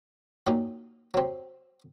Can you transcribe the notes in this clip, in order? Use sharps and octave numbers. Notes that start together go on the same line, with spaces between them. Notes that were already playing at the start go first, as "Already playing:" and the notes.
A#2 F#3 A#3 D#4 G4
F#3 C4 G4